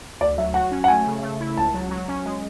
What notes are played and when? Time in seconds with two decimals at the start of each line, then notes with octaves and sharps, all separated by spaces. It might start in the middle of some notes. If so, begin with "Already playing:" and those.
0.21 D2 D5
0.38 F#3 E5
0.54 F#4 F#5
0.71 C#4
0.84 F#5
0.88 A3 G#5
1.06 C#3
1.22 A3
1.40 E4
1.57 C#2 A5
1.74 F#3
1.91 F#3
2.08 C#4
2.25 G#3